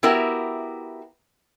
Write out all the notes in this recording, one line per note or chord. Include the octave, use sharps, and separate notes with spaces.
B3 E4 F#4 G4 A#4 E5